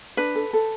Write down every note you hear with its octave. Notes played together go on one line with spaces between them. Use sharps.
D4 B4
A4
A4